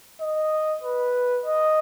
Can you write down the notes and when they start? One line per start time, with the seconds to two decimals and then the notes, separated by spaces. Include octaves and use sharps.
0.21 D#5
0.83 B4
1.46 D#5